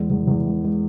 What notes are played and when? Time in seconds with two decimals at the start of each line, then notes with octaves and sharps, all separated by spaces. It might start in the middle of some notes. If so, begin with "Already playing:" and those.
Already playing: E2 G#3
0.10 E2
0.27 E2
0.46 G#3
0.64 G#3